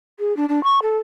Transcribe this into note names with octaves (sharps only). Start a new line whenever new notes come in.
G#4
D4
D4
C#6
A4